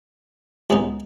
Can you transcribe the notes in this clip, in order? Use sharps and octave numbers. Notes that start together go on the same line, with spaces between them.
C#2 C#3 G#3 B3 D#4